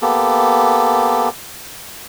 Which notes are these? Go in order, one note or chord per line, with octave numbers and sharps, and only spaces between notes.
A#3 B3 G4 A4